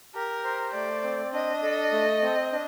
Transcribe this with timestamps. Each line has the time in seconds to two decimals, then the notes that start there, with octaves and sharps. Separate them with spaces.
0.15 G4 A#4
0.44 C5
0.74 A3 D5
1.04 C4
1.33 D4 D#5
1.63 A4
1.92 A3
2.22 C4
2.53 D4